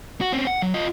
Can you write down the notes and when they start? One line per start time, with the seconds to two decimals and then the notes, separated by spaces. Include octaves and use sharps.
0.21 F#4
0.32 C4 C#4
0.47 F#5
0.62 F#3
0.74 F4 D#5